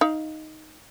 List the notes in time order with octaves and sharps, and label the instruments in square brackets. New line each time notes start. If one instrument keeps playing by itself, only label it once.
[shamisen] D#4 F5